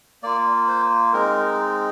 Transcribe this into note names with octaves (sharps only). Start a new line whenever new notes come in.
A#3 F4 D5
C5
G#3 C4 D#4 A#4